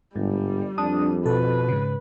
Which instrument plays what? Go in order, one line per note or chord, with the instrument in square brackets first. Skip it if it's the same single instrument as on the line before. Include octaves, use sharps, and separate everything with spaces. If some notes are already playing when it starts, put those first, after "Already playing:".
[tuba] G1 [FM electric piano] G#2 [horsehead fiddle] G3
[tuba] F2 [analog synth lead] D4 [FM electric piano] D#6
[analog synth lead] B2 [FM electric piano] A4 [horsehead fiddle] B4
[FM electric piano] G#2 C#3